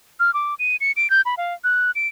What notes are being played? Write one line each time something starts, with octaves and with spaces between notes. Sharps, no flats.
F6
D6
D#7
C#7
D7
G6
B5
F5
F#6
D7